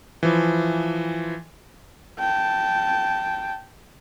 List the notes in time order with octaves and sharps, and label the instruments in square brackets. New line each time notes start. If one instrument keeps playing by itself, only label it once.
[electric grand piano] E3 F3
[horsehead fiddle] G5 A5